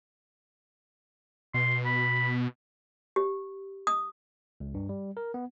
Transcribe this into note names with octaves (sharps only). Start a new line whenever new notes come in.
B2 C6
B5
G4
D#6
C#2
G2
G3
A#4
B3